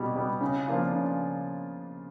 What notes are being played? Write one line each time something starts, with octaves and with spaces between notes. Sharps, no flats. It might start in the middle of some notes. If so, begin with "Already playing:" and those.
Already playing: B2 G3 B3
G3 B3
C#3
F3 A#3 D4 F4
C#3